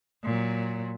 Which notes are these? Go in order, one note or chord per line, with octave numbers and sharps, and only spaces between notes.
A#2 F#3